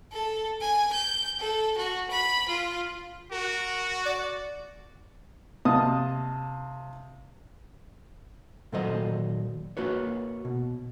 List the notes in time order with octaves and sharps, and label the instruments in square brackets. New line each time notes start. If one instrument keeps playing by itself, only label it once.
[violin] A4
G#5
G6
A4
F#4
B5
F4
[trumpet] F#4 [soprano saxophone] A#4
[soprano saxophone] D5
[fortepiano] C3 D#5 F5 A5 D#6
[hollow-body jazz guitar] A#2 D#3 F#3 A4 C5 D#5
A#3 F#4 B4 C#5
B2